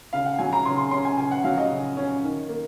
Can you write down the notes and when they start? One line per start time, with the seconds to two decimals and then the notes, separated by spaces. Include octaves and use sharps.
0.13 C#3 F5
0.26 F#5
0.39 F#3 G#5
0.53 A#5
0.65 C#3 C6
0.78 C6
0.91 C#4 C6
1.05 G#5
1.18 C#3 G#5
1.31 F#5
1.44 F#3 F5
1.58 D#5
1.71 C#3
1.97 C#4
2.23 D#3
2.49 A#3